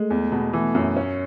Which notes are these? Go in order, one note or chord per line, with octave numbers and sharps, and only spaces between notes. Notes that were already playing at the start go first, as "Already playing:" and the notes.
Already playing: G#3 A3
E2
B2
E3 A3
F#2
C#4